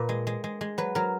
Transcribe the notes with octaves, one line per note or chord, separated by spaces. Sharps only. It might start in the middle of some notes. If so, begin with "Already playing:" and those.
Already playing: A#2 B4
G#3
G#3
G#3
G#3
F#3 B4
F#3 A#4